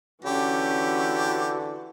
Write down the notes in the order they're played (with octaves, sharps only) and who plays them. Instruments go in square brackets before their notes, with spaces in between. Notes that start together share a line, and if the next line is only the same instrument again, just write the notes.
[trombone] D3 [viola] E3 F#4 [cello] C#4 [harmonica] G4